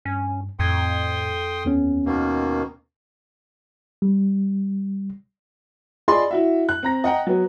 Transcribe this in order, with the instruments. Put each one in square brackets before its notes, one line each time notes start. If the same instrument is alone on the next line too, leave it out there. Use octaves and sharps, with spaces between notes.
[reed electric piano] G2 [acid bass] C#4
[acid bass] F2 [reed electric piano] A2 G#6 [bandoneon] G5 C6 D#6
[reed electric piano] D#2 B3 C#4
[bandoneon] B2 D#3 A#3
[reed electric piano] G3
[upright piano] F4 G#4 D5 D#5 B5 C6
E4 F#4 E5
F#6
C4 A#5 A#6
D#5 F#5 G5 A#5
F#3 B3